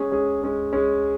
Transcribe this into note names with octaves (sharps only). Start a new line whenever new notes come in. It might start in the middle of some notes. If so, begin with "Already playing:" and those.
Already playing: G#3 C#4 G#4
G#3 C#4 G#4
G#3 C#4 G#4
G#3 C#4 G#4